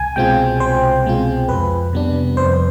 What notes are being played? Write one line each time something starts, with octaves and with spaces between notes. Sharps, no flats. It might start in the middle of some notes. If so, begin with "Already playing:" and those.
Already playing: C2 G#5
B2 G#3 C4 F4 G5
C2 C5
B2 G#3 C4 F4
F2 B4
C3 G3 B3 D4
F2 C5